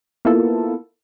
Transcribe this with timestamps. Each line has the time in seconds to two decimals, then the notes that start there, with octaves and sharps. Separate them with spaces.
0.25 A#3 B3 E4 F4 A4